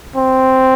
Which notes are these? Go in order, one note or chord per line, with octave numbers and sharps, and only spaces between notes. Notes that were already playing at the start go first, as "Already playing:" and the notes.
C4